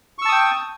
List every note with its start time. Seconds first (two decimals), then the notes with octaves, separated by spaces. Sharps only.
0.18 C#6
0.22 E6
0.25 A5
0.29 D#6
0.32 G5